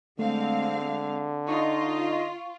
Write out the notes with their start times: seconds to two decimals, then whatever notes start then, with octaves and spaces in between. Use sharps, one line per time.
0.19 D3 G#3 A3 C4 F5
1.48 D#4 F4 D#5 C#6